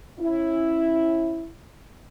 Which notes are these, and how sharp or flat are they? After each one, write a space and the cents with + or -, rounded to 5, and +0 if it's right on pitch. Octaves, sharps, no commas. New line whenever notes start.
C#4 -30 E4 +0